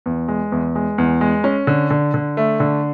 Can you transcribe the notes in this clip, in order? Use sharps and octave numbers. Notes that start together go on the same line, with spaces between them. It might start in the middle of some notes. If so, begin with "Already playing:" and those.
E2
G#3
E2
G#3
E2
G#3
C#4
D3
D3
D3
A3
D3